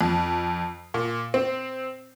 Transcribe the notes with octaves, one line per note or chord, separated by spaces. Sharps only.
F2
A#2
C4